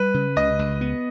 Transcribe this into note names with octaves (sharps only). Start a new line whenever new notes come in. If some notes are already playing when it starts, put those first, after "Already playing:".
Already playing: G3 B4
C#3
C#2 D#5
C#2
B3